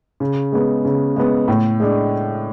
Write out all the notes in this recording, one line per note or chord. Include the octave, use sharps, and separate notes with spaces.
C#3
G#3 B3
C#3
G#3 B3
A2
G#3 D4